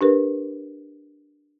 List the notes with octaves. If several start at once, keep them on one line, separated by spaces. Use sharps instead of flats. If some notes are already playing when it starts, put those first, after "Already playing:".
D4 G4 A#4 B4